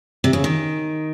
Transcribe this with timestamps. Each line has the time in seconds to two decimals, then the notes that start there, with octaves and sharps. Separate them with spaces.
0.24 C3
0.33 C#3
0.44 D#3